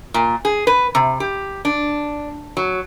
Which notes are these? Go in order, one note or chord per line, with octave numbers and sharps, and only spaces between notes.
A#2
G#4
B4
C3
G4
D4
F#3